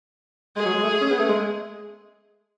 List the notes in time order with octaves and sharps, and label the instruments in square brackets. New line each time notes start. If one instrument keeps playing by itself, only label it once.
[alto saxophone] G#3 [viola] G#4
[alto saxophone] F#3
G#3
A3
C#4
B3
A3
G#3